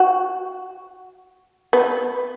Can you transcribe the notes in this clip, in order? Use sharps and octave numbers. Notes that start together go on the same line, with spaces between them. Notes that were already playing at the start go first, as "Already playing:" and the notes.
Already playing: F#4
B3